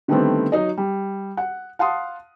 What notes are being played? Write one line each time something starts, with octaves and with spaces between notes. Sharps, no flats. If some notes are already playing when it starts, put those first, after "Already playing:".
D3 D#3 G3 A3 B3 C4
F#3 D#4 D#5
G3
F#5
F5 F#5 A5 C6 D#6